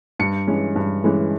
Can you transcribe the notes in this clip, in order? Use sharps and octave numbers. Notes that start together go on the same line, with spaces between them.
G2 C#7
E3 G#3 C#4
G2
E3 G#3 C#4